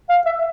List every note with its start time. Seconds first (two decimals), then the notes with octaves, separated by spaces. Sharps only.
0.09 F5
0.26 E5